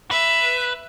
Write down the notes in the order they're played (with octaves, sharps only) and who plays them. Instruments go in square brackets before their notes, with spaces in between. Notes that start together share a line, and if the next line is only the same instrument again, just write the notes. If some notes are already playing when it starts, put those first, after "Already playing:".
[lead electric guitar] B4 [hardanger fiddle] E5